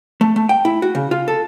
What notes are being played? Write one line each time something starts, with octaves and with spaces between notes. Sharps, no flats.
A3
A3
G5
E4
F#4
C#3
F4
A4